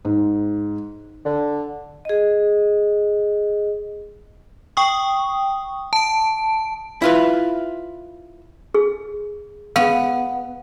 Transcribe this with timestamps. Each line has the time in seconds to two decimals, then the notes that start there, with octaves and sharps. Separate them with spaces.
0.05 G#2
1.25 D3
2.05 G#4 D#5
4.77 G5 C#6 D#6
5.93 A5 D7
7.02 E4 F4 B4
8.74 G#4
9.76 B3 F5